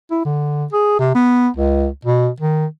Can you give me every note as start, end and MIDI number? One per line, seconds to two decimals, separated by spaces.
0.11 0.21 64
0.25 0.65 50
0.73 0.97 68
0.99 1.14 48
1.15 1.48 59
1.57 1.87 37
2.05 2.29 47
2.40 2.66 51